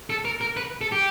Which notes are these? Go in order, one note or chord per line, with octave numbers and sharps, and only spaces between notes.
A4
A#4
A#4
B4
A4
G4